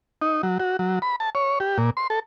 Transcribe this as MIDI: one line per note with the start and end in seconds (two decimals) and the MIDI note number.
0.22 0.42 63
0.43 0.58 54
0.60 0.77 66
0.79 0.99 54
1.02 1.16 83
1.20 1.30 81
1.35 1.59 73
1.60 1.78 67
1.78 1.90 46
1.97 2.07 84
2.10 2.20 69